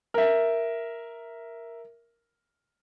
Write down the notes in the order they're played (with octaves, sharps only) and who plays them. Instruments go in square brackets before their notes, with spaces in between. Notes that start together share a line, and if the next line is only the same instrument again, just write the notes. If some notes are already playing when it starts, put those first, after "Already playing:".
[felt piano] A#4 E5